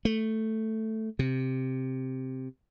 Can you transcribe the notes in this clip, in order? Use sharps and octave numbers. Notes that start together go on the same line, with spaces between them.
A3
C3